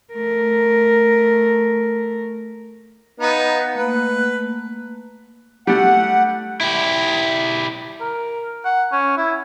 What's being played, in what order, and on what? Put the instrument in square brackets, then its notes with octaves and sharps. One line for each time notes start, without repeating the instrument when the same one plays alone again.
[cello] A3 A#4
[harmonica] B3 D#4 [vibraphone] F5 F#5
[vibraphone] A3 A#3 [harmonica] B4
[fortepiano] G3 A3 [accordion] F#5
[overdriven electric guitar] E4 G4
[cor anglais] A#4
F#5
C#4
E4